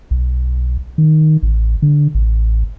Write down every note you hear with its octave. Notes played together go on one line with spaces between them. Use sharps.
B1
D#3
A1
D3
A1